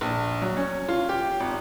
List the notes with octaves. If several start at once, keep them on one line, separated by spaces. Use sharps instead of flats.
A#1
F#3
C#4
F4
G4
G#1